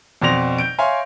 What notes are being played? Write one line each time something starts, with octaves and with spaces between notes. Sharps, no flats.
F2 B2 D5 C6 A#6 F7
G6 D7
C#5 E5 F5 G#5 C6